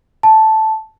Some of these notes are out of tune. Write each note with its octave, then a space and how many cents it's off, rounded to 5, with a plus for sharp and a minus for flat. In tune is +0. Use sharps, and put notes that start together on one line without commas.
A5 -5